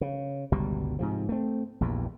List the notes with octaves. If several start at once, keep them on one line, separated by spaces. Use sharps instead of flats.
C#3
G1 C#2 B2 G3
G#2 C3 F3
A3 C4
A#1 E2 G2 A#2